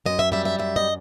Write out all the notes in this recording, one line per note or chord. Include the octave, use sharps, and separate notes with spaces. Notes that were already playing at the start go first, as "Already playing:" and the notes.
F#2 D#5
E5
G3 E5
E5
F#2 E5
D#5